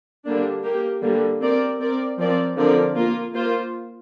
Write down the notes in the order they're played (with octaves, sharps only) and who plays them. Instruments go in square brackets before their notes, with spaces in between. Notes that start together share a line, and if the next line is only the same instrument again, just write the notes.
[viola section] D3 G3 A#3 D4
A#3 G4 A#4
D3 G3 A#3
C4 A#4 D5
C4 A#4 D5
F3 C4 A#4 D5
D3 F3 C4 A#4 D5
A#3 F4 A#4
A#3 F4 C5